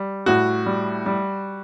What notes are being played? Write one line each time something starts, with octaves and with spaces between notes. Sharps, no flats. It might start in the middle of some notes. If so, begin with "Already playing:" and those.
Already playing: G3
A2 F#4
G3
G3